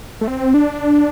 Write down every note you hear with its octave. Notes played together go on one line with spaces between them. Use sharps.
A3
C4
D4